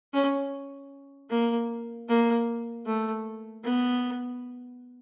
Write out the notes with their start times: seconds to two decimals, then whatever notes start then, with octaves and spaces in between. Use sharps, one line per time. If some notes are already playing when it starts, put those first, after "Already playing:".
0.13 C#4
1.30 A#3
2.09 A#3
2.86 A3
3.64 B3